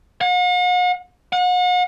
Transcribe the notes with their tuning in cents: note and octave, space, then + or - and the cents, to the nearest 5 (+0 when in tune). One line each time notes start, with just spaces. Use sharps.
F#5 -45
F#5 -40